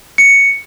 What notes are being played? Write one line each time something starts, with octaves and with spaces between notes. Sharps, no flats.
C#7